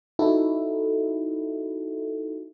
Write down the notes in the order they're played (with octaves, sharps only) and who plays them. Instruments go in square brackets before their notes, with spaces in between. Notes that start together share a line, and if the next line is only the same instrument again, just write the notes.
[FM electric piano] D#4 E4 F#4 A4